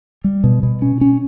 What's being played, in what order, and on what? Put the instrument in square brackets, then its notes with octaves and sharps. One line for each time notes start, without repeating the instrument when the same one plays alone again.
[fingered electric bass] G3
B2
B2
C#4
C#4